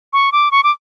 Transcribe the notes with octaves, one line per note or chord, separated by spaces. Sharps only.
C#6
D6
C#6
D6